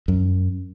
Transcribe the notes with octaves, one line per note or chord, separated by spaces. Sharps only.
F#2